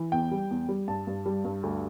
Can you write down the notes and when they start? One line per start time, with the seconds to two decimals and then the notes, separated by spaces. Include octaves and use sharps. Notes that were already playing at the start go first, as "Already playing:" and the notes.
Already playing: E3
0.12 E2 G5
0.31 G3
0.51 E2
0.69 G3
0.88 G2 A5
1.07 G2
1.26 G3
1.45 G2
1.63 D2